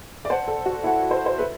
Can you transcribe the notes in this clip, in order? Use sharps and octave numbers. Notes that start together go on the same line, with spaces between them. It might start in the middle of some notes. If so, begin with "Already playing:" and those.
D5
B4 C5 F#5 A5
A4
F#4
E4 B4 F#5 A5
C5
C5
A4 B4 E5 B5